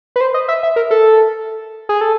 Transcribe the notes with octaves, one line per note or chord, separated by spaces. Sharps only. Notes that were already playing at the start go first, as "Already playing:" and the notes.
B4
C5
D#5
E5
E5
A#4
A4
G#4
A4